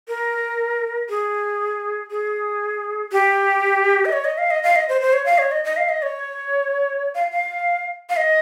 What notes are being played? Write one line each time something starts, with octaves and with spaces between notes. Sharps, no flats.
A#4
G#4
G#4
G4
D#5
C#5
D#5
F5
D#5
F5
D#5
C5
C5
C#5
F5
C#5
D#5
D#5
F5
D#5
C#5
F5
F5
F5
D#5